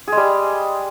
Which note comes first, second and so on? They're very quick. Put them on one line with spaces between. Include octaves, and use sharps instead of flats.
G#4 G#3 G3